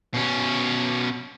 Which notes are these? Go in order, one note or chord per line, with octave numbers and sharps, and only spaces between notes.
B2 C#4